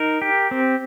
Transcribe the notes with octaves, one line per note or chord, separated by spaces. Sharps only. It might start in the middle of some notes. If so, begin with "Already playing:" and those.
Already playing: D#4 A#4
G4
C4